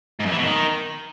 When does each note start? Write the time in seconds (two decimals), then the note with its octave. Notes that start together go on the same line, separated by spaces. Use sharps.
0.20 G#2
0.26 F#2
0.32 E3
0.38 B2
0.44 D#3